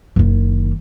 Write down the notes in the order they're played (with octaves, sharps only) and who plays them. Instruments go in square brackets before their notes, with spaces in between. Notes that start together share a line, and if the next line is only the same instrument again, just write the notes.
[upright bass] F#1 D#3